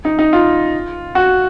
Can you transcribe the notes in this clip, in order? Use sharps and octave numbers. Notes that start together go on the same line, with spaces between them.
D#4
D#4
F4
F#4